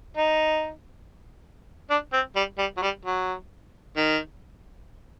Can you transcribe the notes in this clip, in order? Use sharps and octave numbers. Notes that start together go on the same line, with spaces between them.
D#4
D4
C4
G3
G3
F#3
G3
F#3
D#3